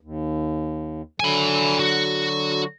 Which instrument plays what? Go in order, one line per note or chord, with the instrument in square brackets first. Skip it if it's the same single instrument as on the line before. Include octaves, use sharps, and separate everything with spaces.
[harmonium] D#2
[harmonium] D3 F#3 [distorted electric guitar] G#5 B5
[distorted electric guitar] F#4